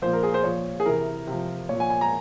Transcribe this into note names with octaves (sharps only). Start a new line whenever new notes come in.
A#2 F3 C5
A#4
G#4
C5
A#2 F3 C#5
G#4
C3 E3 A#4
C3 F3
A#2 F3 C#5
G#5
G#5
A#5